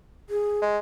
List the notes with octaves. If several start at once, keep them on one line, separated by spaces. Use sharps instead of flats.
G#4
G#3